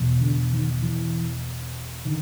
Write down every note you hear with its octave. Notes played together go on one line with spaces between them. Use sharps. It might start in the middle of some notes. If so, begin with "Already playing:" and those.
Already playing: E2 B2
D3
D#3
E3
D3 D#3